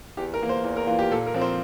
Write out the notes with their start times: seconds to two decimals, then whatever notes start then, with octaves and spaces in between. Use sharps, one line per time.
0.17 E2 G4
0.34 A#4
0.42 E3 A#3
0.49 C5
0.64 E2
0.76 A#4
0.87 E3 A#3 F4
0.99 G4
1.11 A#2 A4
1.26 A#4
1.34 F3 C4
1.41 C5